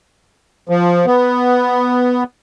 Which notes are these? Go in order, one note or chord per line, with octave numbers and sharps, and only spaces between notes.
F3
B3